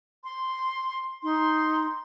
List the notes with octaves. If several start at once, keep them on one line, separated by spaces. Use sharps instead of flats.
C6
D#4 C6